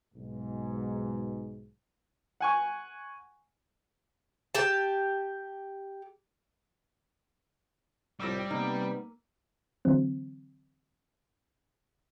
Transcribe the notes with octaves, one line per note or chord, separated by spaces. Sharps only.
B1 G#2
F#5 G#5 C#6
G4 A5
C2 A2 F3 G3 D6 E6 A#6
C3 A#3 B3 D#4
D3 E3 F#3 C4